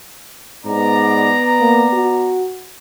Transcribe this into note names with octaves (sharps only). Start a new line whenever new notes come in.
G#2 B3 D5 A#5
A#3
F#4